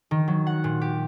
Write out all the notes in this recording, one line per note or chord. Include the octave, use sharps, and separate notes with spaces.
D#3
F#3
F#5
A#2
G4